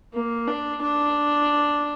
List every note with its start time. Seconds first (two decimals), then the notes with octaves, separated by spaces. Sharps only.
0.14 A#3
0.48 D4
0.81 D4